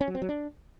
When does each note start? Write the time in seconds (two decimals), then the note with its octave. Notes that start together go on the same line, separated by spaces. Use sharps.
0.01 C#4
0.08 F#3
0.15 C4
0.22 F#3
0.29 D4